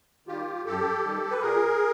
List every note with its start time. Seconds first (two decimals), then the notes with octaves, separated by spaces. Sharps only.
0.27 D#3 G3 F4 G4
0.65 F#2 G4 A4
1.03 D#3 G3
1.31 B4
1.41 A#2 G#4 A#4